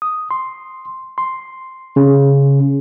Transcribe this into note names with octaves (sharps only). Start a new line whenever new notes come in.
D#6
C6
C6
C#3